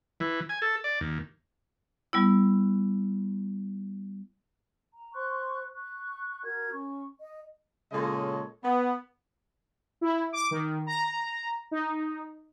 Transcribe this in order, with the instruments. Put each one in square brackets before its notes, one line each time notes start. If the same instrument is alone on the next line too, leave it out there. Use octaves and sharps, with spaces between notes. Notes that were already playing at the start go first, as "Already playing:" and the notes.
[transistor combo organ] E3
G#5
A4
D5
D#2
[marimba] G3 B3 E4
[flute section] A#5
C5 C6 C#6 F#6
C#6 F#6
F#4 A#4 G#6
C#4 C#6
D#5
[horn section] A#2 C#3 G#3 A4 C#5 D#5
B3
[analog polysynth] E4
D6
D#3
A#5
D#4